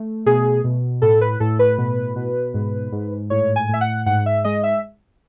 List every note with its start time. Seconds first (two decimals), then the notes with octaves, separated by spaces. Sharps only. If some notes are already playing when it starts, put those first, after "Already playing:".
Already playing: A3
0.26 B2 G#4
0.64 B2
1.02 A2 A4
1.21 B4
1.40 A2 A4
1.59 B4
1.78 B2
2.16 B2
2.54 G#2
2.92 G#2
3.30 A2 C#5
3.56 G#5
3.69 A2 E5
3.81 F#5
4.06 G#2 F#5
4.26 E5
4.44 G#3 D#5
4.63 E5